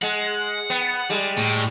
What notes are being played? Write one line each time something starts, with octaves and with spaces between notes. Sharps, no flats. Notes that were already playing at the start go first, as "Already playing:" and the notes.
G#3 F#5
B3
G3 G#3
A2